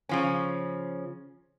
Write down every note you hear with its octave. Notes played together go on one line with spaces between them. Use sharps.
C#3 F3 C#4